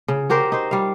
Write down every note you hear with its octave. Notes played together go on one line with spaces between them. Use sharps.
C#3
F#4 G4 A#4 C5
D#4 C5
G3 F5